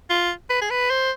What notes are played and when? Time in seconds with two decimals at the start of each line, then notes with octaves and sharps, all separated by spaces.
0.10 F4
0.50 B4
0.61 G#4
0.70 B4
0.90 C5